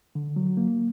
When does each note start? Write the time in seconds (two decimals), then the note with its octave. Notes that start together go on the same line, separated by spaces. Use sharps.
0.15 D3
0.36 F#3
0.57 A#3